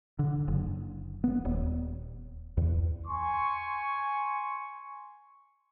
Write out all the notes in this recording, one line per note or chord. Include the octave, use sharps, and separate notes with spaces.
D3
F#1
B3
D#1
E2
G#5 C6 C#6